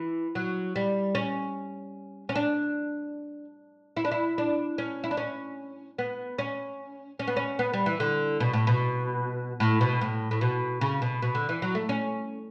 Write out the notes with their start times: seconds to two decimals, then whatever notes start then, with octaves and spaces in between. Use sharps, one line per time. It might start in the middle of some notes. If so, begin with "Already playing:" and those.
Already playing: E3
0.35 F#3
0.76 G3
1.15 C#4
2.29 C#4
2.35 D4
3.96 E4
4.05 D4
4.11 E4
4.38 D4
4.78 C#4
5.04 E4
5.11 D4
5.17 C#4
5.98 B3
6.38 C#4
7.19 C#4
7.27 B3
7.36 C#4
7.59 B3
7.73 G3
7.86 E3
8.00 D3
8.40 B2
8.53 A2
8.67 B2
9.60 A2
9.81 B2
10.01 A2
10.31 A2
10.41 B2
10.81 C#3
11.02 B2
11.22 B2
11.35 D3
11.49 E3
11.62 F#3
11.75 A3
11.89 C#4